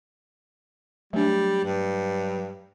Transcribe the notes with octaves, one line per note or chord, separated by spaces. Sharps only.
F#3 G3 A3 D4
G2